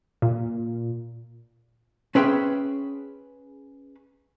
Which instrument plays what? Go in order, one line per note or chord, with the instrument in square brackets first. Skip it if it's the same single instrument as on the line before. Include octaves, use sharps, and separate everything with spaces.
[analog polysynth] A#2
[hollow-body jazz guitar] C#4 G#4 B4 E5 G5 C6